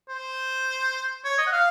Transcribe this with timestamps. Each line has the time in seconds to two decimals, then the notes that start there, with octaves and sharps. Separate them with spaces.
0.09 C5
1.24 C#5
1.38 D#5
1.47 F#5
1.52 F5